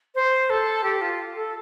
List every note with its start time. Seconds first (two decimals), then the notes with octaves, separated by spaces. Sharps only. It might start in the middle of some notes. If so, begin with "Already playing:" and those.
0.15 C5
0.50 A4
0.84 G4
1.01 F4
1.35 A4